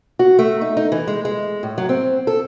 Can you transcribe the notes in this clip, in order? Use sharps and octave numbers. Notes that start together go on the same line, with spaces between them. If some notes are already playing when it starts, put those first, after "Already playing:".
F#4
A3
D#4
D#4
E3
G#3
G#3
A2
F#3
C4
A4